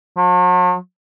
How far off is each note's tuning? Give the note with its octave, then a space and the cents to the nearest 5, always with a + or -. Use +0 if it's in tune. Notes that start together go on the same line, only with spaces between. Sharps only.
F#3 -45